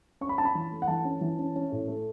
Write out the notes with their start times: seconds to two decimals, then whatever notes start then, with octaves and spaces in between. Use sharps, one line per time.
0.21 C#4 C#6
0.29 B5
0.38 C#4 A5
0.45 B5
0.55 E3
0.72 A3
0.82 F#5
0.88 E3 A5
1.05 C#4
1.21 E3
1.39 C#4
1.56 C#4
1.72 A2
1.88 A3